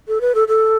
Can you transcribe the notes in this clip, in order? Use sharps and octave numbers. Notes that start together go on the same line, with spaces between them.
A4
B4
A4
A4